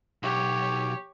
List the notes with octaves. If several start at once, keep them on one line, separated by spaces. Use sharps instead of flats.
B1 G4 C#5